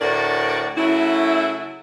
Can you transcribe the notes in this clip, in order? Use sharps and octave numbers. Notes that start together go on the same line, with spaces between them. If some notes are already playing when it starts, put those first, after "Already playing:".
D2 A2 F#4 A#4 D5
C#3 F#3 A3 E4